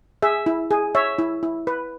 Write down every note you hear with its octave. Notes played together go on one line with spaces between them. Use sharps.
G#4 E5
E4
G#4
C#5 E5
E4
E4
B4